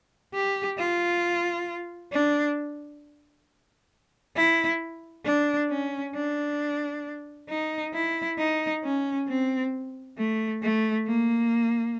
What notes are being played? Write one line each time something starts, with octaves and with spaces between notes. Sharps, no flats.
G4
F4
D4
E4
D4
C#4
D4
D#4
E4
D#4
C#4
C4
A3
A3
A#3